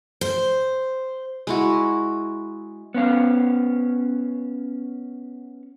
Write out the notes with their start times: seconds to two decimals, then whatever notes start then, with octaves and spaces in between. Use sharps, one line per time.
0.21 C5
1.47 G#3 E4 F#4
2.94 B3 C#4 F5